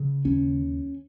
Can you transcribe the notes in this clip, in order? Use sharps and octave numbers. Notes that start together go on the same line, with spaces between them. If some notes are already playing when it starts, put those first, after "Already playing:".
Already playing: C#3
D#2 C#4